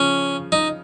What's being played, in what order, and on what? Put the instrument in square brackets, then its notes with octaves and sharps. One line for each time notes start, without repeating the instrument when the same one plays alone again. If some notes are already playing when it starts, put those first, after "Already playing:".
Already playing: [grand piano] C#3 F3 [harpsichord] C#4
[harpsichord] D#4